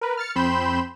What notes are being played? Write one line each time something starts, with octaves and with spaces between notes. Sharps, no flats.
A#4 B4
F6 A6 C#7
F2 C4 B5 C6 G6 E7